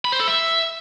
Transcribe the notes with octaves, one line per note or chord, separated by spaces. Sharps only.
B5
C5
A4
E5